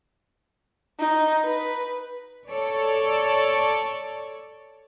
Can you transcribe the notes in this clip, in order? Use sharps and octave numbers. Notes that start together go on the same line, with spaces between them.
D#4
B4
A4 C#5 D5